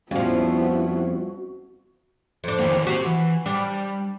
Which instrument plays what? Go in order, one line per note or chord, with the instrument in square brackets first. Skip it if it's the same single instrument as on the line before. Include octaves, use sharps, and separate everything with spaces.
[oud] F2 F3 [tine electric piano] G3 C#4 [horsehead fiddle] B3 E4 [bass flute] F#4
[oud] F2 D4
[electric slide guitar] D#3 E3 A#3
[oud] F#4 [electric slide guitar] G4 C5
[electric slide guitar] E3
[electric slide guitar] G3 [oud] D4